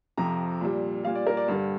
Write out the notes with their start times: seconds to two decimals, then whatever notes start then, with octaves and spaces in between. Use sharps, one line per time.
0.17 F2 C3 F3 A#5
0.61 A#2 G3
1.04 A#2 G3 F5
1.15 D5
1.27 A#4
1.37 D5
1.48 G2 D3 G3